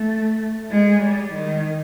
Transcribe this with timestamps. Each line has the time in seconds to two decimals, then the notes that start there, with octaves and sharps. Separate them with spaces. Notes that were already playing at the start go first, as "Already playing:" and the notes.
Already playing: A3
0.70 G#3
1.00 G3
1.32 D#3